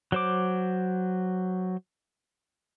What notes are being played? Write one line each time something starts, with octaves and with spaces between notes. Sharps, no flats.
F#3 C5 D6